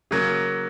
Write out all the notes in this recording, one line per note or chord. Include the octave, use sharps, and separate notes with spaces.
C#3 F#3 A#3